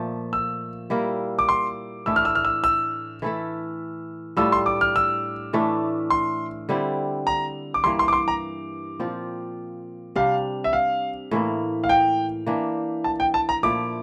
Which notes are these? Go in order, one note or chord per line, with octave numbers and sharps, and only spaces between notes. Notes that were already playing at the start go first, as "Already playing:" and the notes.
Already playing: A#2 F3 A3
E6
G3 A#3 E4 A#4
D6
C6
A2 E3 A3 D4 E6
F6
E6
F6
E6
E6
E3 A3 E4 A4
A2 G3 D4 F4 E6
C6
D6
F6
E6
A2 E3 A3 D4
C6
D3 G3 C4 E4
A#5
D6
G2 E3 A#3 C6
C6
D6
C6
A#5
A#2 F3 C4 F4
C3 G3 D4 F5
E5
F5
A2 E3 A#3
F5
G5
E3 A#3 D4
A5
G5
A5
A#5
A#2 F3 A3 E4 D6